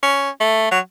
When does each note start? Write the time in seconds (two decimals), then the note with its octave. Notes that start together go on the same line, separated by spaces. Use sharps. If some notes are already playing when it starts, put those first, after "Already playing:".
0.03 C#4
0.40 A3
0.71 F#3